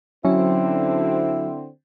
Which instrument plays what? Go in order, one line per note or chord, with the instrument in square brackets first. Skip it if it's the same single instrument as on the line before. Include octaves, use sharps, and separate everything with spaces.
[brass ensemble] D3 C4 [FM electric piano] F#3 F#4 [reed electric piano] C#4 [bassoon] E4